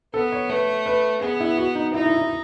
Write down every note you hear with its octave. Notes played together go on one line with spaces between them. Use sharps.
B3 A4
C#5
A3 B4
B4
B3 G#4
E4
F#4
D#4
D#4 E4
E4
E4